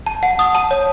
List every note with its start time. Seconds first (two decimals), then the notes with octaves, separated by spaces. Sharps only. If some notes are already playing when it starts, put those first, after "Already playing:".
0.06 A5
0.23 F#5
0.39 D#6
0.55 A5
0.71 C#5